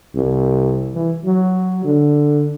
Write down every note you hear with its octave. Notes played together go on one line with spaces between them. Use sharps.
C2
E3
F#3
D3